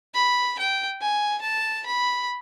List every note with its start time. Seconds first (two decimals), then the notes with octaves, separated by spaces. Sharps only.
0.15 B5
0.59 G5
1.01 G#5
1.42 A5
1.86 B5